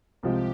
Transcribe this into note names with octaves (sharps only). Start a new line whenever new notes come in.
C2 C3 F3 G#3 G4